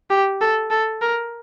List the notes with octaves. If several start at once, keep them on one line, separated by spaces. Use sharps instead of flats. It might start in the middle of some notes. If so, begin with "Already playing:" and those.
G4
A4
A4
A#4